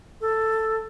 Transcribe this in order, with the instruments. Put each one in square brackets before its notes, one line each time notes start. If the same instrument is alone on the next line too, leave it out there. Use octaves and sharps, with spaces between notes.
[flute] A4